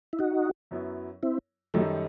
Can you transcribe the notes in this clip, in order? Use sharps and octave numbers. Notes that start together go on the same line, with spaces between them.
E4
D#4 F#4
F#2 F#3 B3 E4
C4 E4
F#2 D#3 F#3 G3 A3 D#4 A4